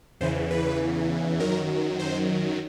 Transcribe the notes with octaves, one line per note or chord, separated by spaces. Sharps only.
E2 C#3 E3 C5
B4
F#2 D#3 F#3 A#4
C5